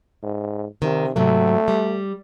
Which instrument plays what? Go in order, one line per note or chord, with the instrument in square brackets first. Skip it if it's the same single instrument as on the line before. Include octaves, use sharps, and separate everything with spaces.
[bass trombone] G#2
[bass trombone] C3 [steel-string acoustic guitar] D#3
[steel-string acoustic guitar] G#2 C3 F#3 [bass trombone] A3
[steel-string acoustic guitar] G3